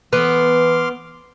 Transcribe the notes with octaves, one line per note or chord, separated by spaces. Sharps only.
E3 B3 C6 D6 F6